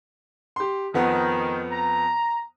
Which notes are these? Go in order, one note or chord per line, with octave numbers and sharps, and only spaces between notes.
G4 C6
F2 D#3 B3
A#5